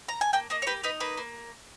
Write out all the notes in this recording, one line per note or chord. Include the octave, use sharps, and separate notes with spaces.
A#5
G#5
A#3 G5
A#3 D#5
C#5
G4 B4
D#4 B4
A#3 B4
A#3